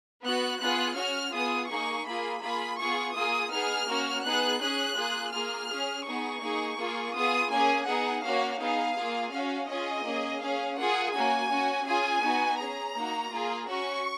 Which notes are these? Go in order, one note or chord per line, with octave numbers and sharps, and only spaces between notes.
B3 F#4 F#6
B3 F4 G#4 F#6
C#4 F#4 F6
B3 F4 G#4 D#6
A#3 D#4 G#4 C#6
A#3 F4 G#4 B5
A#3 F4 G#4 B5
B3 F4 G#4 C#6
A#3 F4 G#4 D#6
B3 D#4 G#4 F6
A#3 C#4 F#4
B3 D#4 G#4 F#6
C#4 G#4 F#6
A#3 F4 G#4
A#3 F4 G#4 F6
C#4 G#4
B3 D#4 G#4 C#6
A#3 D#4 G#4
A#3 F4 G#4
B3 F4 G#4 D#6
A#3 C#4 G#4 G#5
B3 D#4 G#4 F#5
A#3 C#4 F#4 F5
B3 D#4 G#4 F5
A#3 F4 G#4
C#4 F#4 F5
C#4 F4 G#4 D#5
A#3 C#4 G#4
C#4 G#4 F5
A#3 F4 G#4 F#5
A#3 C#4 F#4 G#5
C#4 F#4
C#4 F4 G#4 G#5
B3 D#4 F#4
C#4 G#4 A#5
A#3 D#4 F#4
A#3 F4 G#4
C#4 F#4 C#6